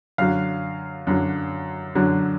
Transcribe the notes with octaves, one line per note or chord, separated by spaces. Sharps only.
F#2 D3 F#3 F5
F#2 D3 F#3
F#2 D3 F#3